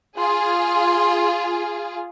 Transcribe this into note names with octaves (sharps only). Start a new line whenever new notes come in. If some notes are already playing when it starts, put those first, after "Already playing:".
F4 G#4 C6